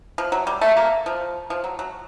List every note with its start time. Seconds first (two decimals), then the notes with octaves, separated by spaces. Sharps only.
0.18 F3
0.32 F#3
0.47 G3
0.61 A3
0.77 A#3
1.06 F3
1.50 F3
1.64 F#3
1.79 F#3